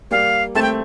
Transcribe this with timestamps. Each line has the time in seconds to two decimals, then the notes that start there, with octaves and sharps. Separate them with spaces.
0.11 G3 A#3 F5
0.55 A3 C4 A5
0.62 G5